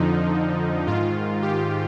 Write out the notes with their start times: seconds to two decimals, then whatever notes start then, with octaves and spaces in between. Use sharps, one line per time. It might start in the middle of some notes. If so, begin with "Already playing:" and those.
Already playing: F2 D3 F3 D#4
0.87 G#2 D#3 F4
1.42 G4